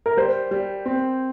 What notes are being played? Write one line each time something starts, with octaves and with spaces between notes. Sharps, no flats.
A#4
G3 C5
G3
C4